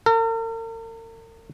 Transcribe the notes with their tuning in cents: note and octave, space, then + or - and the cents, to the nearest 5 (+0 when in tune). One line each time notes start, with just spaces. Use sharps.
A#4 -45